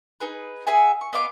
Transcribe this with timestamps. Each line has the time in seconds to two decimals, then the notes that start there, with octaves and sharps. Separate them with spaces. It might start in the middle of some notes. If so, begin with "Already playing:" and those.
0.20 D#4 G#4 B4
0.67 G#4 E5 F#5 G#5
1.01 C#6
1.13 B3 D#5 F5 D6